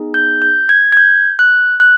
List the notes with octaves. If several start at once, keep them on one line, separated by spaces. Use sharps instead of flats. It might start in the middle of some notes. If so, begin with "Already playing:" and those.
Already playing: B3 D#4 G#4
G6
G6
G#6
G#6
G6
F#6
F#6